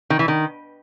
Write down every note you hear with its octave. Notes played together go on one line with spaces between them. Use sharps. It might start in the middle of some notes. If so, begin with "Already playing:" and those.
D#3
E3
D#3